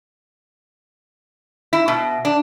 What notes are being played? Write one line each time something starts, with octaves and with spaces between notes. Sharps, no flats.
E4
B2
D4